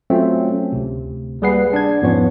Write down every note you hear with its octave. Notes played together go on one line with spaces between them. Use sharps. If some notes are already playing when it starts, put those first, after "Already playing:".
F#3 A3 C4 C#4 F4
D2 C3
G3 A#3 G#4 B4 F#5 C7
D4 G#6
E2 G#2 F3 B3 C#4 C#5